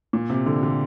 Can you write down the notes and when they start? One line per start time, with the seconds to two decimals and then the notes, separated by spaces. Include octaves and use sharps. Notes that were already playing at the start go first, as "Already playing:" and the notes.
0.13 A#2
0.30 C3
0.46 D3
0.63 D3